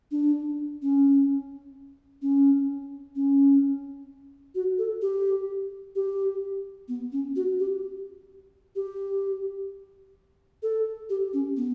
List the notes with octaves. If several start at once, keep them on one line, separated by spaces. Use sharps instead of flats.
D4
C#4
C#4
C#4
F#4
A4
G4
G4
B3
C#4
F#4
G4
G4
A4
G4
C#4
B3